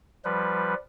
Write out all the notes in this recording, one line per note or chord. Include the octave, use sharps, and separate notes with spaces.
F3 G3 B4